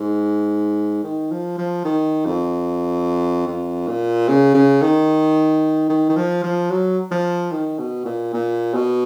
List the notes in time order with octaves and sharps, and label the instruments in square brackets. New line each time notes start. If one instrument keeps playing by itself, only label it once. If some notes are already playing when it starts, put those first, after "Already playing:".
Already playing: [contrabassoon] G#2
D#3
F3
F3
D#3
F2
F2
A#2
C#3
C#3
D#3
D#3
D#3
F3
F3
F#3
F3
D#3
B2
A#2
A#2
B2